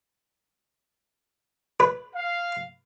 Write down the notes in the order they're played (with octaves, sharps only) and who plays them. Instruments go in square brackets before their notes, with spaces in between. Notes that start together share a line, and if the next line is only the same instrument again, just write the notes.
[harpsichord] B4
[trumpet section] F5